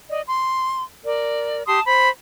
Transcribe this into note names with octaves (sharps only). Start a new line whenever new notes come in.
D5 D#5
C6
A#4 D5
G4 A5 C6 D#6
C5 B5